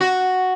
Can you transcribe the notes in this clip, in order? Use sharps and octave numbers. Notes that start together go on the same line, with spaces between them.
F#4